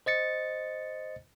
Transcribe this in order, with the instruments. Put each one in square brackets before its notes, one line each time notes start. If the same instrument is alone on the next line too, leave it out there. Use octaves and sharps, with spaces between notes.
[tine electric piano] C5 D#5 A6 C#7